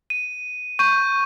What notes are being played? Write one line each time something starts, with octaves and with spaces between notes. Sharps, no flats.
D#7
C#6 G6 D#7